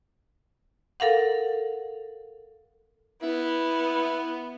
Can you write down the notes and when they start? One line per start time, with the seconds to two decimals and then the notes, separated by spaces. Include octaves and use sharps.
1.00 A4 A#4 F5 F#5
3.22 B3 E4